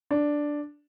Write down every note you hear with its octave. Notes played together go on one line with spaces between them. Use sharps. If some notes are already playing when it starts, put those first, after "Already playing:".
D4